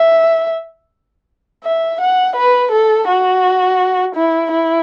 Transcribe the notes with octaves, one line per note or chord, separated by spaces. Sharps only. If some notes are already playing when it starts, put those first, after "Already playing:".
Already playing: E5
E5
F#5
B4
A4
F#4
E4
E4